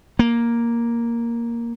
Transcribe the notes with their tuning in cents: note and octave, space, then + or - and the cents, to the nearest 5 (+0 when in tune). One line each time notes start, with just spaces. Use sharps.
A#3 +5